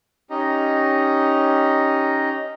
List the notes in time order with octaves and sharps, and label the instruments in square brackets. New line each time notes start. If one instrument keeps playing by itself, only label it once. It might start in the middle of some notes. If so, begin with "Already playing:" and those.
[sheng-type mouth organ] C#4 D#4 G4 D#5 A#5